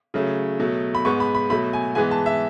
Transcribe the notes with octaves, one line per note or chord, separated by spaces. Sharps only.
C#3 F#3 A3
B2 F#3 A3
B5
G#2 G#3 B3 C#6
B5
B5
B2 F#3 A3 B5
G#5
G#2 E3 G#3 B3 G#5
A5
E5